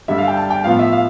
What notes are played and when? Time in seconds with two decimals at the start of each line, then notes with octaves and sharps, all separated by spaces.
0.08 G2 D3 G3 E5
0.18 F5
0.28 G5
0.37 A5
0.50 G5
0.64 A2 F3 B3 F5
0.79 E5
0.92 F5